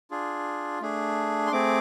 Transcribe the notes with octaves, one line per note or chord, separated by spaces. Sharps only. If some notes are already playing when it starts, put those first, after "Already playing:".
D4 F4 G#4
A3 D4 G#4
C6
A3 C4 G#4 D6